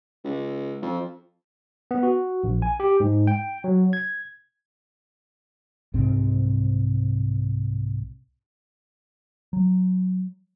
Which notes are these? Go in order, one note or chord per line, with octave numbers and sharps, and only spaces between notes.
C#2
F2
B3
F#4
A#1
G#5
G4
G#2
G5
F#3
G#6
C2 G#2 C4
F#3